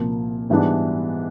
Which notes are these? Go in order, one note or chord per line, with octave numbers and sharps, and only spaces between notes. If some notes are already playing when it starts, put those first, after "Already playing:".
Already playing: C2 A#2 F3 A#3
G#2 E3 G3 B3 D4